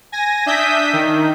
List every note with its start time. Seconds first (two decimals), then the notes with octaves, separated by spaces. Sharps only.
0.12 G#5 A#6
0.46 D4 E5 D#6 G6 B6
0.93 D#3